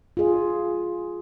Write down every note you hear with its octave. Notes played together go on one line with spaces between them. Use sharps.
F4 G#4